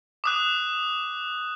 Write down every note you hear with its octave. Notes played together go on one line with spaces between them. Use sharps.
D6 D#6 F#6